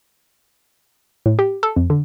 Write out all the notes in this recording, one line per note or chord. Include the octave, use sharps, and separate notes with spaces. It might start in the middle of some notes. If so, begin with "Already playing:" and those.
A2
G4
A4
F2
D3